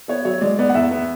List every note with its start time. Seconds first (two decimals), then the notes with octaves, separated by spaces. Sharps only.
0.08 B3 C#5
0.25 F#3 C#5
0.41 G#3 D5
0.59 B3 D5
0.69 F#5
0.74 E2 E5
0.91 B3